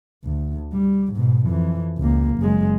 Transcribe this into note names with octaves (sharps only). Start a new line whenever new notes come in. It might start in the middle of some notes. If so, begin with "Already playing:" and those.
D2
G3
G#2 B2
F2 E3
C#2 A#3
F#1 G#3